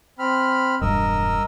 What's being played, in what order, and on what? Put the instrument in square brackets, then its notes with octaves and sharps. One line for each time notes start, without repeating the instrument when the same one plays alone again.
[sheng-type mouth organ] C4 B5 F6
[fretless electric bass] E1 G2 [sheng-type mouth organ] A#4 D#5 E6